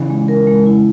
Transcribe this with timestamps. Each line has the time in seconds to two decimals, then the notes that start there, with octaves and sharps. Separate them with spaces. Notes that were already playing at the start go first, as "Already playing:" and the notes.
Already playing: C#3 E3
0.10 G#3
0.28 A#4
0.47 G#3
0.66 E4